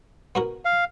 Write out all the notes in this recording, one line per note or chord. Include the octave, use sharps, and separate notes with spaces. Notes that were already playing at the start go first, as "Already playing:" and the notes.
B3 F#4 A#4
F5